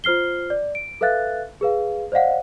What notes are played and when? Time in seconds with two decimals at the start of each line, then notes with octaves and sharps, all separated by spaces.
0.04 F4 C5 F6 C7 G7
0.50 D5
0.75 D7
1.01 A4 B4 E5 F5 F#6 A6
1.61 G#4 B4 F5
2.12 C5 D5 D#5 F5 F#5